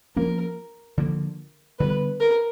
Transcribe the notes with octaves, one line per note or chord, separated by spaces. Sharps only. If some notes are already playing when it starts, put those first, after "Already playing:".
F3 A#3 C#4 A#4
D3 F3 A#3
D3 G3 B3 B4
A#4